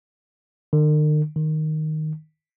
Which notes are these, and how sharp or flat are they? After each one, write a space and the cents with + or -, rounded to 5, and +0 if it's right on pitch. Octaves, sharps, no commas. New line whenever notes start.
D#3 -45
D#3 -5